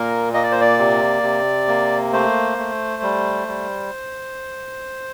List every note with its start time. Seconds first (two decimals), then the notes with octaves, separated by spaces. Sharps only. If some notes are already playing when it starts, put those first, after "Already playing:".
Already playing: A#2 A#3 A#4
0.34 A#3 D#5
0.43 D5
0.52 C5
0.61 D5
0.79 C3
1.23 C3
1.68 A#3
2.13 A3 C5
2.58 A3
3.03 G3
3.48 G3